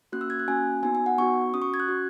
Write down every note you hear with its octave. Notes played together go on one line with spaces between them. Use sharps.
A#3 C#4 F#4 F#6
E6
G#6
F#6
A#3 C#4 F#4 G#5
B3 D#4 F#4 G#5
G#5
F#5
B3 D#4 F#4 C#6
C#4 F#4 D#6
C#6
G#6
F#6
C#4 F#4